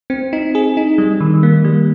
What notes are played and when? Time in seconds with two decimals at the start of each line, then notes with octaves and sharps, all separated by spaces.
0.10 C4
0.33 D#4
0.55 G#4
0.77 D#4
0.98 G3
1.21 D#3
1.43 A#3
1.64 G3